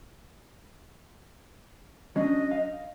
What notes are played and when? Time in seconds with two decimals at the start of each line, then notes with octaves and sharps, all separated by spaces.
2.16 F#3 C#4 D4 D#5
2.51 F5